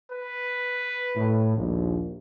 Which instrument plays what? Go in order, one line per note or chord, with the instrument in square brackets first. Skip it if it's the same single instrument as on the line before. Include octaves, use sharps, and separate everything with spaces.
[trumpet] B4
[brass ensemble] A2
A#1 D#2